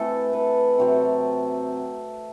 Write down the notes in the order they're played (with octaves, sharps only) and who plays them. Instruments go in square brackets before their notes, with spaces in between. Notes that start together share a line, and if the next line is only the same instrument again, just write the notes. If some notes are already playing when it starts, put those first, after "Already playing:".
Already playing: [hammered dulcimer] E3 A3 C4 A4
B4
C3 F#3 C4